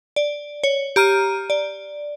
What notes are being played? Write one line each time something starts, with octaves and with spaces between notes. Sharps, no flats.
D5
C#5
G4 A#5 F6 D#7
D5